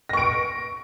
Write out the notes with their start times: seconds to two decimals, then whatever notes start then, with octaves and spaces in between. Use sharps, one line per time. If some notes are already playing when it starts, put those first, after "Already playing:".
0.09 A#6
0.13 C#6
0.17 D7